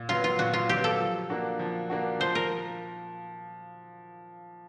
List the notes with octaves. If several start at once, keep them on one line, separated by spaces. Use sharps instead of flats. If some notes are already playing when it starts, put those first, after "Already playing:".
Already playing: A#2
F#3 B3 F4
F4
A#2 F#4
F4
F#3 B3 G4
A4
F3
A#3 D4 F#4
F3
A#3 D4 F#4
F3 C5
A#4